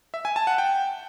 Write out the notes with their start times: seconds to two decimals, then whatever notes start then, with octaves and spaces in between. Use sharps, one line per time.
0.14 E5
0.25 G#5
0.36 A5
0.47 F#5
0.58 G5